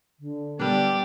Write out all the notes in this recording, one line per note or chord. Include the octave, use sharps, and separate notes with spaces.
D3
G3 B3 D4 G4 D5